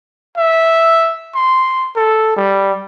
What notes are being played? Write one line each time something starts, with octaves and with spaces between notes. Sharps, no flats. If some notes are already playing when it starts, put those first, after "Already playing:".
E5
C6
A4
G3